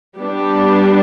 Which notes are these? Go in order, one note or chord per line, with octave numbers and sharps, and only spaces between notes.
G3 B3 D4 G4